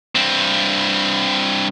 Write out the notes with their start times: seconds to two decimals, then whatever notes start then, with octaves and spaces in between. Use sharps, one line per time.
0.15 G2 C4